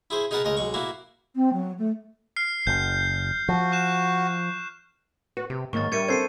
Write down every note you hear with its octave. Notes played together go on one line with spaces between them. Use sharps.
E4 G#4 C5
D#4 G#4 A#4 B4 F#5 A5
C#2 G#3 A#4 D#5
B1 G#3 C#6
A#3 E4 F#4
C4
F#3
A3
F6 C7
F#1 G6
F3 F#4
C#6 F#6 E7
F#4 B4
C3 G4
G#2 D#3 F#3 A#3 C#6 A6
G3 D4 A#4 E5 G#6 C#7 D#7
C4 A4 C5 G#6 C7 D#7